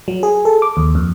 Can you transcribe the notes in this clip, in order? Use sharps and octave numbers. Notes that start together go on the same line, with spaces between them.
F#3
G#4
A4
D6
D#2
F2